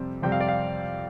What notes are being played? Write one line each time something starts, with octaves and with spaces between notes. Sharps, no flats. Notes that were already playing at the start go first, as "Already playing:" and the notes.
Already playing: F2 C3 G3 C4
F2 C3 G3 C4 G5
F5
D5
F5